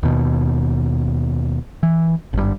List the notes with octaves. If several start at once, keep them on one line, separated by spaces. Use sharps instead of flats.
D#2 B2
E3
G#1 G2